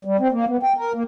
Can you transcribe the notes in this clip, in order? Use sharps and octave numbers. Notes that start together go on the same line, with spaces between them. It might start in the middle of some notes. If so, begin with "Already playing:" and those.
G3
C4
A#3
B3
G5
A#4
A#3